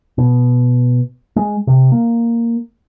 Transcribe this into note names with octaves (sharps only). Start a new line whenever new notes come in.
B2
G#3
C3
A#3